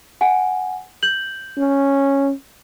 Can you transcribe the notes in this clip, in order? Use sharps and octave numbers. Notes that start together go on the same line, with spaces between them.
F#5 G#5
G6 F#7
C#4